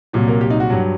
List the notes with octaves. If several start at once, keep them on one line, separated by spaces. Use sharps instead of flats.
C2 A#2 F#3
A#4
G4
D#4
F#4
G2 F#3